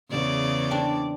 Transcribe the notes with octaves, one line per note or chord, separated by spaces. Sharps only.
E2 C#3 D5
C4 D4